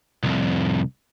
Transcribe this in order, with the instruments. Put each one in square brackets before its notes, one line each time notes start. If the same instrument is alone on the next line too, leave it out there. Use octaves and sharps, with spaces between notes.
[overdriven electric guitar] C2 F2